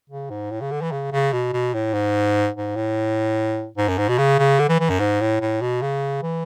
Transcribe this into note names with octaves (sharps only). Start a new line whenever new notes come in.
C#3
G#2
A2
C#3
D3
E3
C#3
C#3
B2
B2
A2
G#2
G#2
A2
G#2
F#2
G#2
B2
C#3
C#3
D3
E3
E3
F#2
G#2
A2
A2
B2
C#3
E3